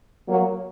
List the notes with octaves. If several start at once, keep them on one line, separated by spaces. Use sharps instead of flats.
F#3 A#3